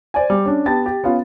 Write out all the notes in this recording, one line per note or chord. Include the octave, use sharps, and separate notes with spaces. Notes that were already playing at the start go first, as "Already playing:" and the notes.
C5 D5 G#5
G3
C#4 D4
B3 G4 A5 A6
G4
B3 C#4 F4